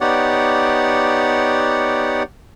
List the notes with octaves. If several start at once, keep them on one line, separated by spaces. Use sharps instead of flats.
B3 D#4 G4 C#5 D5 F#5